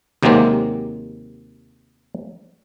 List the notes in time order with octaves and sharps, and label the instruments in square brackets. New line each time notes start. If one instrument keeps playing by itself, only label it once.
[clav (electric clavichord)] D#2 C3 F#3 G#3 A#3 C4